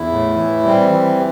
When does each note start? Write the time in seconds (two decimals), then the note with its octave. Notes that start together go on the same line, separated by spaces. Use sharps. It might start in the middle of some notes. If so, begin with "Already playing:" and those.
Already playing: E2 E4
0.11 A2
0.37 E3
0.64 G3 C4
0.92 E3